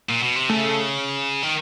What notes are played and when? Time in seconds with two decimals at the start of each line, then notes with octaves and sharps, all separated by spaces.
0.09 A#2
0.23 B2
0.36 C3
0.49 C#3 A3
1.43 D#3